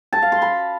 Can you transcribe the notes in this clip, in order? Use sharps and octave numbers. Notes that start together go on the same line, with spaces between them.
A5
F5
C6
B5